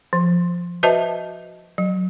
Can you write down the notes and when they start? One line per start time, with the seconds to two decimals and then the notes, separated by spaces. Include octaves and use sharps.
0.13 F3
0.83 F#4 B4 C5 D#5 E5 A5
1.78 F#3